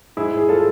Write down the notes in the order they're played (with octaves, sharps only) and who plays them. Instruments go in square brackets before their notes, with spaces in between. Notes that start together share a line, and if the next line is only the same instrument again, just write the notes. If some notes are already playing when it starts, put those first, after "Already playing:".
[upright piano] G#2 E4 G#4
G#2 G#4
F4 A4